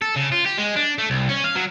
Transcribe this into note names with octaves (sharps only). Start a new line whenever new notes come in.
A4
C#3
F4
G4
G#3
D4
A3
C2
C#4
F5
F#3